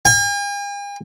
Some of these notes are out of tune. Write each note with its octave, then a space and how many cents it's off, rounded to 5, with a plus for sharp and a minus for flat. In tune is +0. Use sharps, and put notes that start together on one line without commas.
G#5 -45